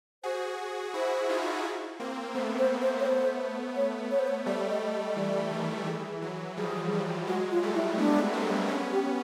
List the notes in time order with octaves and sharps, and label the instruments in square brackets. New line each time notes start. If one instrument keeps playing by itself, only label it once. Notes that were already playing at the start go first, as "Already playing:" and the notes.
[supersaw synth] F#4 G#4 [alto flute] C5
[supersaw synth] E4 F#4 [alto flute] C5
[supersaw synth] D#4 F4
A#3 C4
[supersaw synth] A3 B3 [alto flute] C5
[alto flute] C5
C5
C#5
C5
C#5
C#5
C5
C#5
[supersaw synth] G3 A3 [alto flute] D5
[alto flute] D#5
D#5
[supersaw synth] E3 [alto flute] D5
[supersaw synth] D#3
[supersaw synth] E3 [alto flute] G#4
[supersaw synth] E3 F#3
[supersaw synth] F3 G3 [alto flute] G#4
[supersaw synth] F3 G3
[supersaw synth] F#3 G#3 [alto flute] F#4
[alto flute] F4
[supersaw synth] G3 A3
[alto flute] E4
[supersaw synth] A3 B3 [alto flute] D4
[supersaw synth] A#3 C4
[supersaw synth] B3 C#4 [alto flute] D4
[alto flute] G4